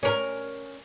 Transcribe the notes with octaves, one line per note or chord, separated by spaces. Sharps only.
C#4 A#4